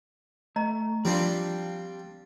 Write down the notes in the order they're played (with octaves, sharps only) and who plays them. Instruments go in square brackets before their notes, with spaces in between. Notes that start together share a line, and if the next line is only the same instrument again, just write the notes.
[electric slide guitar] A3 [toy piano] D#5 A#5
[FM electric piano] F3 [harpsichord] G3 C4 D4 [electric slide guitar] D5 F5